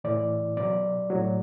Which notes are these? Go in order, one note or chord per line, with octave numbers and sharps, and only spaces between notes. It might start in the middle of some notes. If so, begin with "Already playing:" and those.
A2 E3 D5
B2 F#3 D5
A2 F#3